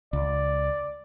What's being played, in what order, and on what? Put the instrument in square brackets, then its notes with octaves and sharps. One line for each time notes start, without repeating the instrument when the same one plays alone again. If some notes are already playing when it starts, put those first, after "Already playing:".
[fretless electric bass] C#2 [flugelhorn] D5